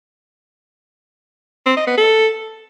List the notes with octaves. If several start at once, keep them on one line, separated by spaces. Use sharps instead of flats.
C4
D#5
B3
A4